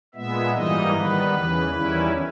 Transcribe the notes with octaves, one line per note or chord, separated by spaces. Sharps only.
A#2 G#3 B3 E5
G#2 E3 G3 A#3 D#4 D#5
D#3 G3 B3 B4
E2 C#3 E3
E2 D#3 G3 C#4 E4